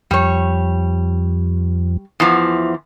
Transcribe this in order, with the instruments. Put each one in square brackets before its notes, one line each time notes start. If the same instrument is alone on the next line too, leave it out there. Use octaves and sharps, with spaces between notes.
[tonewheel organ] F2 [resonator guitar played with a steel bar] G3 C#5
[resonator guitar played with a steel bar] E2 E3 F3